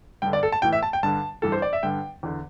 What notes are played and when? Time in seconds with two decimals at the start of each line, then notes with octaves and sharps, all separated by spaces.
0.22 G2 D3 G5
0.33 D5
0.43 A4
0.52 A5
0.62 A2 E3 G5
0.73 E5
0.83 A5
0.93 G5
1.03 G2 D3 A5
1.42 G2 E3 A4
1.52 C5
1.62 D5
1.73 E5
1.83 G2 D3 G5
2.23 E2 D3